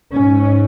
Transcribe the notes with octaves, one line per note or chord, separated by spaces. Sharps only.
G#2 C#4